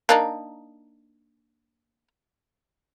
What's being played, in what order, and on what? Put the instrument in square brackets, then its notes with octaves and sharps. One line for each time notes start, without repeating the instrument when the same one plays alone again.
[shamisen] A#3 D4 D#4